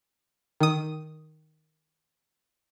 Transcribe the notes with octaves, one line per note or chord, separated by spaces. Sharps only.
D#3 D#6